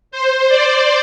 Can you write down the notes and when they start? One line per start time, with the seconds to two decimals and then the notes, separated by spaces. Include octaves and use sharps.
0.11 C5
0.49 D5